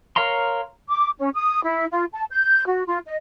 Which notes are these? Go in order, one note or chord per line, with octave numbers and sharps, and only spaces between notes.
A#4 C#5 F5 A#5 C6
D6
C#4
D#6
E4
F4
A5
G6
F#4
F4
D#5